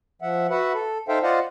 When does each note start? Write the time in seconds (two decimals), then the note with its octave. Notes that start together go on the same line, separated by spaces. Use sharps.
0.22 F3 E5 F#5
0.50 F#4 B4 E5 F#5
0.74 A4
1.08 D#4 A4 C5 E5 F5 G5
1.23 F4 C5 D5 D#5 F5 F#5